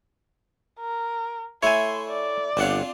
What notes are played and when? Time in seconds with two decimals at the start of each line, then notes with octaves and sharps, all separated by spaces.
0.80 A#4
1.63 A3 E4 C#5 G#5 C6
2.08 D5
2.57 G1 C4 D4 F4 F#5